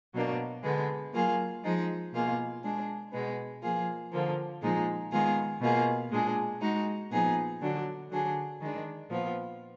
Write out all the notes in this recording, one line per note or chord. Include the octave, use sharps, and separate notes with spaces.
B2 F#3 A#3 D4
D3 G#3 B3
F#3 A#3 F4 G#4
F3 G#3 D#4
B2 A#3 F4 G#4
G#3 D4 G#4
B2 G#3 B3
F3 A#3 F4 G#4
D3 F3 A#3
A#2 F3 G#3 D#4 G#4
D#3 G#3 B3 F4 G#4
B2 A#3 F4 G#4
A#2 G#3 D4 G#4
G#3 D#4 F#4
A#2 F3 B3 D#4 G#4
D3 F#3 D4
D3 F#3 D4 G#4
D#3 G#3 D4
A#2 F3 B3 F4